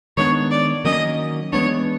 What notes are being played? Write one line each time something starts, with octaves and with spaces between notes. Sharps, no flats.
D#3 G#3 B3 D4 C#5
D5
D#3 F#3 A#3 C#4 D#5
E3 G#3 B3 D4 C#5